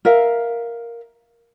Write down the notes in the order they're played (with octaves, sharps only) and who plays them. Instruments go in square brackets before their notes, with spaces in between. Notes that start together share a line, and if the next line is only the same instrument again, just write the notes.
[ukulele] A#4 E5 F5